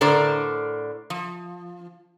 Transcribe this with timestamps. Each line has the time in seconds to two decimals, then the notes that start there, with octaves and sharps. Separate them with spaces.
0.01 A2 D3 A#4 C5 D5
1.10 F3